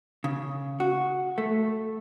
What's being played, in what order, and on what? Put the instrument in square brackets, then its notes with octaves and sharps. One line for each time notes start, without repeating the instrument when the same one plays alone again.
[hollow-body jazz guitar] C#3
F#4
A3